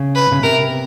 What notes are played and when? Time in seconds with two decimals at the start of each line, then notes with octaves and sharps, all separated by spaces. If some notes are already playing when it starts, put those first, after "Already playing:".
Already playing: C#3
0.15 B4
0.31 C#3
0.43 C3 A#4